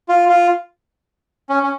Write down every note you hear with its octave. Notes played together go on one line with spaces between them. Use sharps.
F4
F4
C#4
C#4